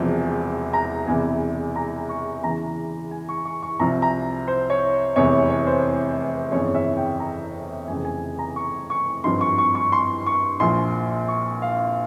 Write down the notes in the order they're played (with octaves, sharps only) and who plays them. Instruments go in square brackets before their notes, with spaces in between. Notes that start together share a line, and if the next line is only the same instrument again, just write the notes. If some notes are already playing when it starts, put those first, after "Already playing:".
Already playing: [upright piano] E1 E2 C3 F3
A#5
E1 E2 C3 E3 G#5
A#5
C#6
E2 C#3 E3 A#5
G#5
C#6
C#6
C#6
C2 C3 F3 A#5
A#5
C5
C#5
F1 E2 C3 E3 C#5
C#5
C5
G1 F2 C#3 E3 C#5
E5
G5
A#5
F1 F2 C#3 E3 G#5
G#5
A#5
C#6
C#6
G#1 G2 F3 C6
C#6
C#6
C#6
C6
C#6
A#1 A#2 F3 C6
C#6
F5